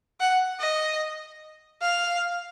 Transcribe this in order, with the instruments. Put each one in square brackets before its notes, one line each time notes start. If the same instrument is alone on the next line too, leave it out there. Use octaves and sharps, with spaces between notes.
[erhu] F#5
D#5
F5